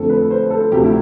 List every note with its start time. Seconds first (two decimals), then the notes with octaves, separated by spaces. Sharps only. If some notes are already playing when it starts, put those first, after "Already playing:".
Already playing: F2 D3 A3 A4
0.09 B4
0.31 C5
0.50 A4
0.72 D2 C3 F3 A3 G4
0.84 E4